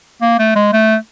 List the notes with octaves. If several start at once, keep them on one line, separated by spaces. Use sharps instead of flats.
A#3
A3
G#3
A3